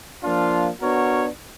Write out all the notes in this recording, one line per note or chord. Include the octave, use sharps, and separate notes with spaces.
F3 A#3 D4 F4
B3 D4 F#4 A#4 C#5